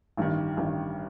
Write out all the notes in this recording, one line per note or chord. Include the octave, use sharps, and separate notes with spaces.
A1 G2 D#3
A1 G2 D#3